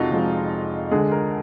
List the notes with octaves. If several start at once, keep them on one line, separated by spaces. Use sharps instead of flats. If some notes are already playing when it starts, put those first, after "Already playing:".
Already playing: F1 F2 G#3 D#4 F4 F#4
F1 F2 F3 G#3
D2 D3 G#3 G#4
A#4